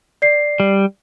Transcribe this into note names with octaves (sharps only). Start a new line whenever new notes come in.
D5 C7
G3